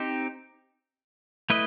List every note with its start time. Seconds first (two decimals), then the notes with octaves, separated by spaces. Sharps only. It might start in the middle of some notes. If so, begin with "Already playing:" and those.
Already playing: C4 D#4 G4 C5
1.50 A3 E4 B4 D#5